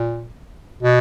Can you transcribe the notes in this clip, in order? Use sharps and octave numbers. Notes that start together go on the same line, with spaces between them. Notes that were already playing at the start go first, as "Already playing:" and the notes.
Already playing: A#2
B2